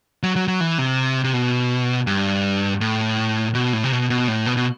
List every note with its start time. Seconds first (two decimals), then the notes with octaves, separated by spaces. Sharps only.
0.23 F#3
0.36 F#3
0.48 F#3
0.60 E3
0.78 C3
1.24 C3
1.34 B2
2.07 G2
2.81 A2
3.54 B2
3.73 A2
3.84 C3
3.92 B2
4.10 B2
4.28 A2
4.46 B2
4.57 B2